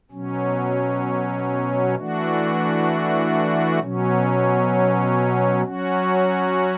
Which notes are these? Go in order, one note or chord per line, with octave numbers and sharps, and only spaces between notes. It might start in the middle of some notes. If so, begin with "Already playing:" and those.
B2 F#3 C#4
E3 A3 D4 F#4
B2 F#3 C#4
F#3 C#4 F#4